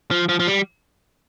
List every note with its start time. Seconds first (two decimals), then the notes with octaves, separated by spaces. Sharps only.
0.11 F3
0.29 F3
0.40 F3
0.47 G3